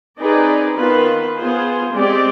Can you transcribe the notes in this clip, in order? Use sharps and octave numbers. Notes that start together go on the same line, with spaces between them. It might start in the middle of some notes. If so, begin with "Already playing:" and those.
C4 D#4 G#4 B4 D5
D#3 B3 F4 B4
B3 F4 G#4 C5
G#3 C4 G4 D5